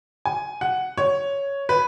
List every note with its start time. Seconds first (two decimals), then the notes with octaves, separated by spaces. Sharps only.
0.25 G#5
0.61 F#5
0.98 C#5
1.69 B4